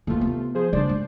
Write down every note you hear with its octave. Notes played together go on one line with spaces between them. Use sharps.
D#2 C3 E3 A3 F4
B3
F3 G#4 C5
C#3 G3 D4 C5 D5
G#3